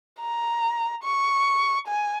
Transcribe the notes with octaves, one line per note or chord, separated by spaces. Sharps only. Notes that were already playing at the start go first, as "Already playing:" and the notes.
A#5
C#6
G#5